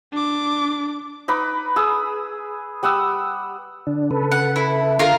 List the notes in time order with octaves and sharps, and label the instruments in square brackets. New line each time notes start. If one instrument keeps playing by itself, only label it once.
[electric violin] D4 D6
[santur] D#4 B4 B5 D6
G#4 D#6 E6
G3 F#5 D#6 E6
[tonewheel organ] D3 D4
C#3 A4 B4
[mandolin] F#5
E4
[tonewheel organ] D3 [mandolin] F4 A#4